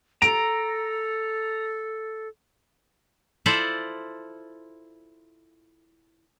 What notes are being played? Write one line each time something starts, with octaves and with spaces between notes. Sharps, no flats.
A4 A#5 D7
E4 F4 A4 C5 D5